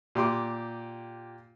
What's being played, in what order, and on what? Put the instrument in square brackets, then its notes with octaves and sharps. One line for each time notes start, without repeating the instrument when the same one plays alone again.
[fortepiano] A#2 G4 C6 D6